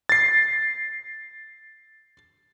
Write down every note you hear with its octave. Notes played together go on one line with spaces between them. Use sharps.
A6 C7